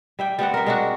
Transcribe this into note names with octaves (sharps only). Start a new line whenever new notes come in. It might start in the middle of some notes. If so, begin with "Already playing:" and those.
G3 E5 G5
G3 B3 C4 F#5
A#4 E5
G#3 D4 F#4